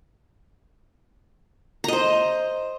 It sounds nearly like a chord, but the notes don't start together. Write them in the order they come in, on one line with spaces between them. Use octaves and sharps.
A#5 D#5 C5